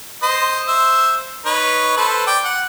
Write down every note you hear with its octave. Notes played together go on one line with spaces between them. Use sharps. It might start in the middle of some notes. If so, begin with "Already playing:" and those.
C5 D#5
C5 E5
D#4 B4 C#5
A4 B4 C5
D5 G5
F#5